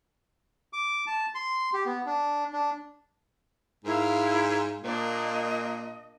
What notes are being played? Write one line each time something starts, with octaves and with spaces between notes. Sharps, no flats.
D6
A5
C6
G4
B3
D4
D4
G#2 E4 A#4 F5
A#2 A#3 D4 D#5